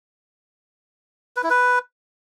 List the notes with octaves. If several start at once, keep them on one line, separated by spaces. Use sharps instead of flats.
B4
E4
B4